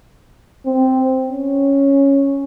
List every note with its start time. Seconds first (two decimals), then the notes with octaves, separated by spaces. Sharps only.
0.66 C4
1.28 C#4